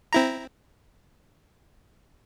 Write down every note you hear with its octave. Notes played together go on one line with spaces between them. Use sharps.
C4 E4 A#5